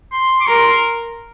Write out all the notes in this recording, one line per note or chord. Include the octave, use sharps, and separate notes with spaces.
C6
D6
A#4 C6